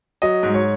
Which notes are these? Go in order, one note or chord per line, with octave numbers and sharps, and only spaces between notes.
F#3 D#5
G#2
C#5